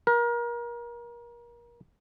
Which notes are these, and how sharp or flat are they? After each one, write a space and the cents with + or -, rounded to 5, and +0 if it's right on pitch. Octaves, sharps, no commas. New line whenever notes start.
A#4 +30